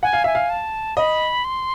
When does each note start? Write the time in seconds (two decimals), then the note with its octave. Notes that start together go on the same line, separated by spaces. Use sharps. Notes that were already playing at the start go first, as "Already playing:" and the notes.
0.03 F#5 G#5
0.13 F5
0.24 E5 G#5
0.35 F5
0.50 A5
0.97 D#5 B5
1.44 C6